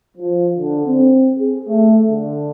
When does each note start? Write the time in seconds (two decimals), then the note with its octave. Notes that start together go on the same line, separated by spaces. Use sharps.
0.18 F3
0.57 D3
0.86 C4
1.36 G#4
1.68 A3
2.10 D3